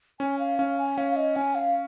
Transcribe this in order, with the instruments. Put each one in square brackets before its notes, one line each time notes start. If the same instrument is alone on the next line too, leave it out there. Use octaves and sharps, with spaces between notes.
[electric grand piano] C#4 [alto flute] G#5
[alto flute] F5
[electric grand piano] C#4 [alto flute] F5
[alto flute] G#5
[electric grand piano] C#4 [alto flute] F5
[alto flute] F5
D#5
[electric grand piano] C#4 [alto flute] G#5
[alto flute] F5